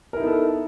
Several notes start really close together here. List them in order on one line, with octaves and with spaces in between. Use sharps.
A#4 E4 D#4 B3 A4